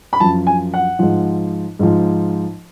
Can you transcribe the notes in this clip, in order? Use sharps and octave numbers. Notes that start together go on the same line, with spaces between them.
B5
F#2 F3 A5
G#5
F#5
G#2 F3
G#2 F3